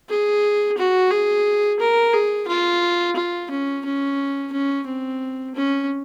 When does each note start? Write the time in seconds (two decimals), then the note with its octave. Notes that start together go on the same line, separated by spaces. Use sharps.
0.09 G#4
0.78 F#4
1.11 G#4
1.80 A#4
2.13 G#4
2.48 F4
3.16 F4
3.51 C#4
3.85 C#4
4.53 C#4
4.87 C4
5.55 C#4